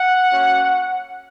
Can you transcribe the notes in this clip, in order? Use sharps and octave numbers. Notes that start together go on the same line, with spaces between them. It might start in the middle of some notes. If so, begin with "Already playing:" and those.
Already playing: F#5
A#3 C#4 F#4